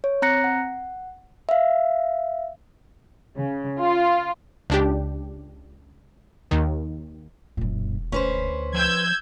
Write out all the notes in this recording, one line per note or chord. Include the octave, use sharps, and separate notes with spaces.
C#5
C4 A#5 F#6 A#6 C#7
F#5
E5 F5
C#3
F4
C#2 D4 G4
D#2 D#3
E1 F#2 A#2
D2 C#4 B4 C5
F3 E6 G6 G#6